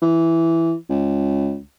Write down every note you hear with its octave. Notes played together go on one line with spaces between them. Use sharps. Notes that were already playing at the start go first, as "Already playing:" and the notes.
E3
C#2